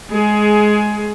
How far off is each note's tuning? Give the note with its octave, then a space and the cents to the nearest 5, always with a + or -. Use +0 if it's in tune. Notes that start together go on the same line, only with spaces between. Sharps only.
G#3 +15 G#4 +20